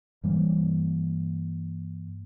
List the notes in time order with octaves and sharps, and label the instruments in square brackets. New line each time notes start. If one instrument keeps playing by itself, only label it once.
[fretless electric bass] G2 E3 G3 A#3